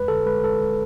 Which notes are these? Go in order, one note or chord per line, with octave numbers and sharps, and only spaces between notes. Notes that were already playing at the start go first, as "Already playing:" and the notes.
Already playing: F2 G#3 B4
D3 A4
G#3 B4
G#3 A4
G#3